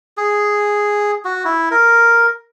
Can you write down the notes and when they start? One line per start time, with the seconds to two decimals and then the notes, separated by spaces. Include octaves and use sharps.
0.17 G#4
1.25 F#4
1.45 E4
1.71 A#4